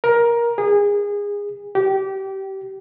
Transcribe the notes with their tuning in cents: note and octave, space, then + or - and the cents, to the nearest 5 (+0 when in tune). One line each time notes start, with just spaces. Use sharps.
A#4 +15
G#4 -25
G4 -25